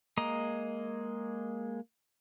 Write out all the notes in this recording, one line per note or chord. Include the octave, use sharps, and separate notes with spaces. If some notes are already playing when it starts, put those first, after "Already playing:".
G#3 A#3 D#5 A#5